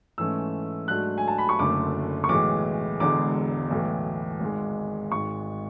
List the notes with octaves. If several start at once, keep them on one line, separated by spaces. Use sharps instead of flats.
G#2 E3 A3 C#4 E6
G#2 F#3 A3 D4 F#6
G#5
A5
B5
C#6
F#1 F#2 D3 A3 D6
C#6
B1 A2 E3 G#3 D6
E1 E2 D3 G#3 D6
B1 A2 E3
G#1 G#2 G#3
G#1 G#2 G#3 C#6